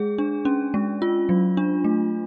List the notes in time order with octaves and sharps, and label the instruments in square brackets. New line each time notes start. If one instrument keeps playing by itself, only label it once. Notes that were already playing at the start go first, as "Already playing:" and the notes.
Already playing: [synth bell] G#3 G#4
D4
C#4
G#3
F4
F#3
D4
A3